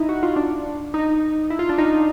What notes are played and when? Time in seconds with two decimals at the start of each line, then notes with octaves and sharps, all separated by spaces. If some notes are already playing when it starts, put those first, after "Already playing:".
Already playing: D#4 E4
0.09 F#4
0.23 F4
0.36 D4
0.94 D#4
1.50 E4
1.59 F4
1.69 D4
1.78 D#4